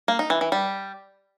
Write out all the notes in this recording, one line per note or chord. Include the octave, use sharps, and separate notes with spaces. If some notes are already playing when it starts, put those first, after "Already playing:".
A#3
D#4
E3
E3
G3